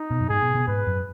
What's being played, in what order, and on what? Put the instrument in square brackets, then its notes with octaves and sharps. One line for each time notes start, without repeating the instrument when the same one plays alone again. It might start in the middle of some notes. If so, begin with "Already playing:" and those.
Already playing: [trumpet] D#4
[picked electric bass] B2
F#2
[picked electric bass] G#2 [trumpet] G#4
[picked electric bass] B2
B2
[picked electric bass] G#2 [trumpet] B4
[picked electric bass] F#2